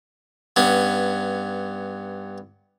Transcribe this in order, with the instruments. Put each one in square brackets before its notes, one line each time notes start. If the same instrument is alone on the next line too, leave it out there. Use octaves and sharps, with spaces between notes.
[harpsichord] G2 B3 C#4